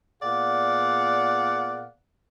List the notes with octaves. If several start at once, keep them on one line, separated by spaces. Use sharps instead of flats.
A#2 B3 G#4 D5 F5 F#5